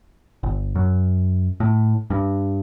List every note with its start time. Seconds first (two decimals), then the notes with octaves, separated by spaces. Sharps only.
0.43 G1
0.75 F#2
1.60 A2
2.10 G2